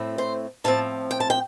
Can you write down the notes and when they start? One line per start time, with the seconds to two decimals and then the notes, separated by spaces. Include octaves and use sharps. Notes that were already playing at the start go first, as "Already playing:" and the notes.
Already playing: A2 A3 C4
0.18 C5
0.64 A2 F3 C4 A5
1.11 G5
1.20 A5
1.30 G5